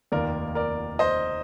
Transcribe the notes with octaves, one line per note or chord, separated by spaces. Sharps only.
F1 D#2 D#3 A#3 A#4 D5
A#4 D5
C5 D#5